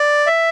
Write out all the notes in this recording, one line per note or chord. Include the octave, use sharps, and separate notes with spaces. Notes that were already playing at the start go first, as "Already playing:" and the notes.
Already playing: D5
E5